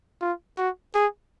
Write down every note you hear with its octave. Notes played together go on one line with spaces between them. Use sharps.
F4
F#4
G#4